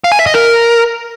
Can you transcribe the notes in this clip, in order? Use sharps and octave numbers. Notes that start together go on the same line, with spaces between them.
F5
G#5
E5
D#5
A#4